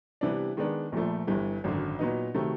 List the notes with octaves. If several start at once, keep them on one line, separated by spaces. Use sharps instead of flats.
C3 E3 G3 B3 D4
D#3 G#3 B3 D4
A#1 A#2 F3 A3
G1 G2 E3
G#1 F#2 D3
A#2 F#3 B3 D#4
C3 D#3 F#3 A3